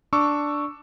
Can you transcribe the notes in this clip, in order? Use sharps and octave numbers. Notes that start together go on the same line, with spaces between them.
D4 C#6 D6 E6